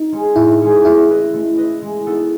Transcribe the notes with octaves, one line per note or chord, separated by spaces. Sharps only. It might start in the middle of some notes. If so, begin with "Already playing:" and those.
Already playing: D#4
G#3 C#4 G#4
A2 E4
G#3 C#4 G#4
A3 E4
E4 B4 D#5
A3
E4 B4 D#5
G#3
B3 D#4 A4